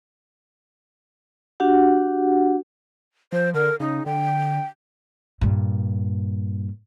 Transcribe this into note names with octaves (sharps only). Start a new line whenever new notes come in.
D4 F#4 G4 F#5
F3 C5
D3 A#4
C#3 D#4
D3 G5
G2 A#2